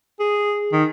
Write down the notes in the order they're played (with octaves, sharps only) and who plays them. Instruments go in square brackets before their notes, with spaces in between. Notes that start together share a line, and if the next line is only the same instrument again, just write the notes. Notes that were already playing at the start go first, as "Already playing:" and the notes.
[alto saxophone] G#4
D#3